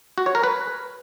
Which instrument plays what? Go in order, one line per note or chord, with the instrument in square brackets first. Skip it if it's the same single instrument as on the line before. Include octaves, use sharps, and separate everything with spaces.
[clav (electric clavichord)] F#4
C#5
A#4
B4